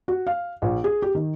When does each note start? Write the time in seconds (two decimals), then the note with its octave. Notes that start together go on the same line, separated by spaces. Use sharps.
0.08 F#4
0.27 F5
0.62 A#1
0.84 G#4
1.02 G4
1.15 D#3